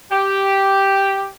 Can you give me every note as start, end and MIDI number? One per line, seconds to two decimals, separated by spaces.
0.11 1.30 67